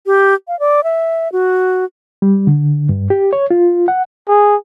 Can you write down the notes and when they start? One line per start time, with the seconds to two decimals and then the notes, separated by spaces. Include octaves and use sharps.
0.06 G4
0.48 F5
0.60 D5
0.84 E5
1.32 F#4
2.22 G3
2.47 D3
2.89 G2
3.10 G4
3.33 C#5
3.51 F4
3.88 F#5
4.28 G#4